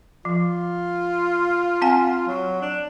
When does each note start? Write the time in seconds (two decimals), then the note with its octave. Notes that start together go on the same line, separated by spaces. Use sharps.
0.25 F3 F4
1.82 C4 F#5 G#5
2.27 F#3
2.62 D4